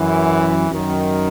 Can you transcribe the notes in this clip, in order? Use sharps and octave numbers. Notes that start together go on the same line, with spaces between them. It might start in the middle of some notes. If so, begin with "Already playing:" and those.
Already playing: F#2 E3
F#2 D#3